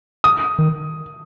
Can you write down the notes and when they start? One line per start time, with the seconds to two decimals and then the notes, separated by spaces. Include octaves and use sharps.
0.24 D#6
0.59 D#3